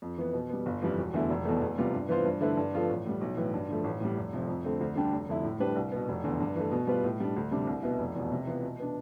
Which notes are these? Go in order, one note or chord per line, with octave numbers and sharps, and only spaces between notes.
F2
E3 B3
B2
G3 B3
G1
F2 E3 G3
E1
E2 D3 A3 E4
F1
E2 B2 A3
E2
C3 G3 B3 F4
G2
E3 B3 F4 C5
G2
D3 A3 E4 B4
G2
F3 B3 F4 A4
A1
A2 G3
B1
A2 E3
G2
D3 F3 A3
A1
A2 G3
F1
F2 C3 F3
F2
D3 A3 C4
D2
D3 G3 D4 G4
F1
F2 D3 A3 E4
A2
G3 D4 G4 B4
C2
B2 B3
F1
E2 D3
G2
E3 A3
B2
G3 B3 F4 B4
A2
G3 D4
D2
C3 G3 D4
C2
B2 B3 E4
F1
E2 B2
C3
E3 B3 F4
B2
B3 D4